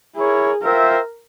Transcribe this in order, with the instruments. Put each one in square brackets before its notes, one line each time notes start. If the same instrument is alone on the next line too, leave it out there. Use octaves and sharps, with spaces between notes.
[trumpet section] E4 A#4 C#5 [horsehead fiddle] G#4
[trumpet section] F4 C5 E5 G5 [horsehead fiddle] A#4